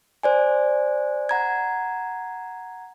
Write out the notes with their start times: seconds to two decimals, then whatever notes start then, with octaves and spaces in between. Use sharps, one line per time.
0.23 C5 D5 G#5
1.29 F#5 A#5 G#6